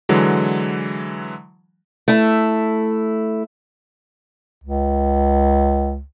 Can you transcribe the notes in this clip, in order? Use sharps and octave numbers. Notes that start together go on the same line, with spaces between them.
D3 E3 F#3 G#3
A3 E4
C#2